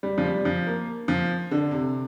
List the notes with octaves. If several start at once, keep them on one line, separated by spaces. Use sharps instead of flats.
G3
F3
G3
F3
A#3
F3
D3
C3